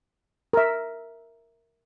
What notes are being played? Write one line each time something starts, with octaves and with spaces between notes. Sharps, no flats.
A#4 E5